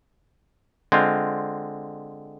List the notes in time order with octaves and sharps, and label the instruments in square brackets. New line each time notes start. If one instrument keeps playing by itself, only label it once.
[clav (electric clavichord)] D3 G#3 C4 F4